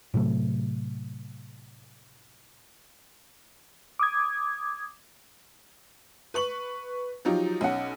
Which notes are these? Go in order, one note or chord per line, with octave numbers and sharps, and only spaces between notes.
A2 C3 F#3 A3
D6 D#6 G#6
B4 C#6 F#7
F3 F#3 D#4 F4 G4
B1 C#4 F#5